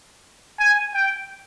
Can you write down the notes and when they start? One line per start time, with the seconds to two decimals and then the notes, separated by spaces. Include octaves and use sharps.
0.60 G#5
0.94 G5